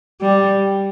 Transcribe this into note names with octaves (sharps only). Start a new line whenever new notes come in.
G3